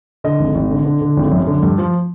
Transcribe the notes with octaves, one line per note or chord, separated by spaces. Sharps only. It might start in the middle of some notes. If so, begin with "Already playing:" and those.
D3 D#5
G#1
G#1
D3
D3
D3
G#1
F#2
D3
G2
F3